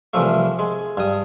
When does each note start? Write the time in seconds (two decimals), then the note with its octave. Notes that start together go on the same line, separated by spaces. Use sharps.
0.14 C2 E3 F3 A3
0.59 G#3
0.97 G2 D#6